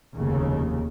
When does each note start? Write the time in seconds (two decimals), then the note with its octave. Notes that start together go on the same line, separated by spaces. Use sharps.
0.15 F1 D#2 C#3